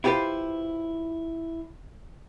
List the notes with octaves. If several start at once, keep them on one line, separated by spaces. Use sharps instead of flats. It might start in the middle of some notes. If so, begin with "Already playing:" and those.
E4 F4 G4 A4 B4 C5